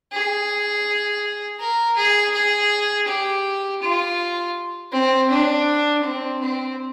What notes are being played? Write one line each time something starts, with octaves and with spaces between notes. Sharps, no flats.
G#4
A#4
G#4
G#4
G4
F4
C4
D4
C4
C4